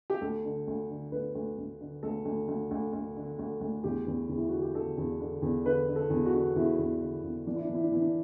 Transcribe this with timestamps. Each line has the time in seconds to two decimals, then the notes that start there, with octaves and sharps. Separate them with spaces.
0.10 G4
0.21 D2 A4
0.45 D3
0.68 D2
0.90 D3
1.12 D2 B4
1.35 D2
1.58 D2
1.81 D3
2.03 D2 A4
2.25 D2
2.48 D2
2.71 D2
2.93 D2
3.16 D3
3.39 D2
3.61 D2
3.84 E2 G4
4.07 E2
4.29 E2
4.37 E4
4.49 D3 F#4
4.62 G4
4.74 D3 A4
4.97 E2
5.20 D3
5.42 E2
5.65 D3 B4
5.88 D3
5.96 A4
6.10 E2
6.26 F#4
6.34 D3
6.56 E2 E4
6.79 E2
7.01 D3
7.23 E2
7.47 E3 D4
7.56 E4
7.64 D4
7.69 E3
7.74 E4
7.83 D4
7.92 E3 E4
8.02 D4